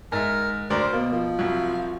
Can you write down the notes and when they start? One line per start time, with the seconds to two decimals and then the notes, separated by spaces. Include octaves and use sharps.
0.12 G#2 A#4 E5
0.70 D2 A#4 C5 D5
0.93 B2 A#3
1.12 F3
1.39 C2 F#3